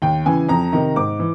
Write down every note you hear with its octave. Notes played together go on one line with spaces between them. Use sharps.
D#2 G5
C#3 E3 G#5
F2 A#5
C3 D#3
G#2 D6
E3